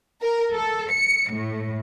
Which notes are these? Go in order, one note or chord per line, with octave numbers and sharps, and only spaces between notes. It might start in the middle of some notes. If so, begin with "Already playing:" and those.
A#4
A4
C#7
A2